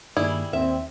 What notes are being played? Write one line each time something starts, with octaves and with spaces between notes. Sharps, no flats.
G2 D#3 G3 A#3 E4 G#4
D#2 C4 E5